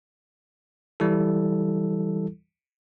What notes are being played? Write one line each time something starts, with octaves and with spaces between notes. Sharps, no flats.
E3 G3 E4 A4